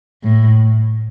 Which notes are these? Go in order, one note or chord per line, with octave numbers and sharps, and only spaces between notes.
A2